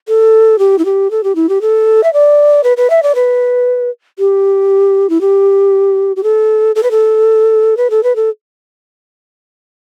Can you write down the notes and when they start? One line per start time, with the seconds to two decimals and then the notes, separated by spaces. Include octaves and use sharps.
0.08 A4
0.59 G4
0.78 E4
0.85 G4
1.11 A4
1.24 G4
1.35 E4
1.49 G4
1.61 A4
2.03 E5
2.13 D5
2.64 B4
2.77 B4
2.90 E5
3.03 D5
3.15 B4
4.19 G4
5.10 E4
5.21 G4
6.16 G4
6.23 A4
6.75 A4
6.83 B4
6.91 A4
7.77 B4
7.90 A4
8.03 B4
8.16 A4